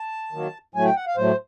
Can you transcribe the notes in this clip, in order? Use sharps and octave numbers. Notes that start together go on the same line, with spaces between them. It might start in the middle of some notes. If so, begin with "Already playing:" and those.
Already playing: A5
D#3 F#3 A#3
A2 F#3 A3 G#5
G5
F#5
F5
A2 F#3 A3 C5